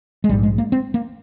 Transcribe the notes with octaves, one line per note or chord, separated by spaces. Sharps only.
G#3
A#1 G#2 G3
G#3
A#3
C4
A#3